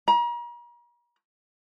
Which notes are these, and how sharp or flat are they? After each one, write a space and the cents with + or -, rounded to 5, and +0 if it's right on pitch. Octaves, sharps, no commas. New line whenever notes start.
A#5 +40